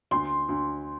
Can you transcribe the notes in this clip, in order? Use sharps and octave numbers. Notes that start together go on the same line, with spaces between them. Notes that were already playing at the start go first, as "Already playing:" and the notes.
D2 C6
D2